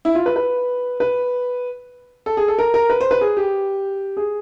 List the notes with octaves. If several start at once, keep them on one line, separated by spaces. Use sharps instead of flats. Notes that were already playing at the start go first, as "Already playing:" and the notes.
E4
F4
B4
B4
B4
A4
G#4
A4
A#4
A#4
B4
C5
B4
G#4
G4
G#4